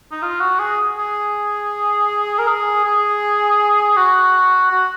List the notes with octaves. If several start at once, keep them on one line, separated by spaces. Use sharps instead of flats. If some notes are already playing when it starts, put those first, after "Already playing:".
D#4
F4
F#4
G#4
G#4
A#4
G#4
G#4
F#4
F#4